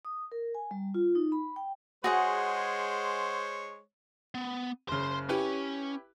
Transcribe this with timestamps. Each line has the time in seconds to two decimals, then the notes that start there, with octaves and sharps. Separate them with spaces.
0.05 D#6
0.32 A#4
0.55 G#5
0.71 G3
0.94 F4
1.15 D#4
1.32 B5
1.56 G5
2.04 G#3 F#4 G#4 C5 C#5 F#5
4.34 B3
4.88 F#1 C#3 C5 C6
5.29 C#4 E4 G4 B4